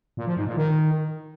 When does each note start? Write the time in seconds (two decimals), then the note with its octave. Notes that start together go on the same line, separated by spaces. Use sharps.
0.17 A#2
0.27 F3
0.37 G#2
0.47 A#2
0.57 D#3